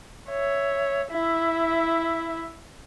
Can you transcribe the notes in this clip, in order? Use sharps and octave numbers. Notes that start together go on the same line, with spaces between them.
C#5 E5
E4 E5